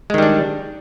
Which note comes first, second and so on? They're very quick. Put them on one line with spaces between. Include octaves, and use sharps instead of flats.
G#3 D#3 G3 D4